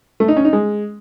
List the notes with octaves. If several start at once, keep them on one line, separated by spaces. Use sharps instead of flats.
A3
D#4
C#4
D#4
G#3